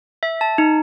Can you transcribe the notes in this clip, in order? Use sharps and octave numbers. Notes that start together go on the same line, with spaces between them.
E5
A5
D#4